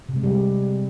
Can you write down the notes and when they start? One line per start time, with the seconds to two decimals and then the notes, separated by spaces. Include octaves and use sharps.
0.09 C3
0.16 G#3
0.23 G3